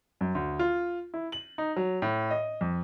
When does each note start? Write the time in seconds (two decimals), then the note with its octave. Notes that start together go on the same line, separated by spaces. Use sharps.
0.21 F#2
0.35 D2
0.59 F4
1.14 E4
1.32 F#7
1.58 D#4
1.76 F#3
2.02 A2
2.31 D#5
2.61 F2